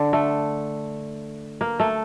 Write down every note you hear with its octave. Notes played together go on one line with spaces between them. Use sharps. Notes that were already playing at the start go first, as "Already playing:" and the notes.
Already playing: D3
A3
A#3
A3